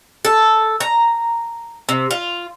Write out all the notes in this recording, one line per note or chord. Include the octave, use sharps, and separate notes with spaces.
A4
A#5
C3
F4